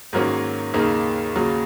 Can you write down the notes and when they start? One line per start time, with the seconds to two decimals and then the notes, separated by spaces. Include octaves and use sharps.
0.13 G#2 D#3 F#3 A#3 C#4
0.74 D#2 C#3 A#3 D#4
1.35 D#2 C#3 F#3